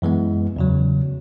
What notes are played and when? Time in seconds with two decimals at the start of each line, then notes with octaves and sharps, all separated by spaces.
0.02 F#2 E3 G#3 B3
0.56 E2 C#3 F#3